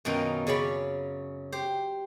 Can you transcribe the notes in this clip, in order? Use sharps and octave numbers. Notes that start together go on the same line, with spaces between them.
F#2 B2 D#3 D#4 F4
C#3 C#4 D5 B5
G4 C5